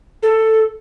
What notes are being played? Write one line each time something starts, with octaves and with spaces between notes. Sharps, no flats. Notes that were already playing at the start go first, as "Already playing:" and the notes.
A4